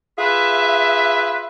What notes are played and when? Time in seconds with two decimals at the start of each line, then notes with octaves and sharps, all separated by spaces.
0.19 F4 G#4 B4 E5